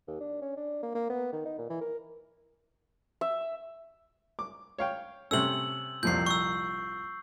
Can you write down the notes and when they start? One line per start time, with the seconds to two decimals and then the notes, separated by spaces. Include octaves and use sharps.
0.07 D#2
0.20 D4
0.42 C#4
0.57 D4
0.83 A#3
0.95 A#3
1.10 B3
1.33 D#3
1.45 D#4
1.58 A#2
1.70 E3
1.81 A#4
3.21 E5
4.39 D6
4.78 C#5 F5 G5
5.31 C3 A3 C#4 E6 F#7
6.03 C2 F2 A#2 G6 C7
6.26 C#6 E6